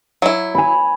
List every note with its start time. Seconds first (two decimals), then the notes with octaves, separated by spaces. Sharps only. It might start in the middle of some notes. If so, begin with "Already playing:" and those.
0.22 F#3 E4
0.55 G#5 B5